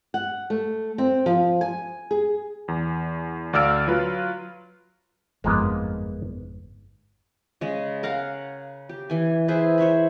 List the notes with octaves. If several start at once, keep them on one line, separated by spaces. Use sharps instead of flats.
F#5
A3
C4
F3
G#5
G#4
E2
D2 D5 F5 E6 F6 D7
F#3 F4 B4
G1 F2 G#2 G#3 A#3 B3
C#3 G#3
A#4 F5 F#5 A#5
G4
E3 G#5
E4 G#4 B4 C5
C5 C#5 E5 B5